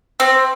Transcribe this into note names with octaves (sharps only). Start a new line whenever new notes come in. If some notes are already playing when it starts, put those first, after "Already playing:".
C4